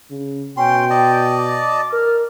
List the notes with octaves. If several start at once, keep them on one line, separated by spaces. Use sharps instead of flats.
C#3
B2 C#4 G5 C6
D5 D#5 A5
D6
A#4 F6